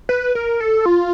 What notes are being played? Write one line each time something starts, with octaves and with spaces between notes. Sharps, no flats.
B4
A#4
A4
F4